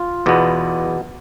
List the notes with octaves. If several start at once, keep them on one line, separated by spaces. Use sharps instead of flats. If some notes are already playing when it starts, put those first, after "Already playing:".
Already playing: F4
E2 B2 B3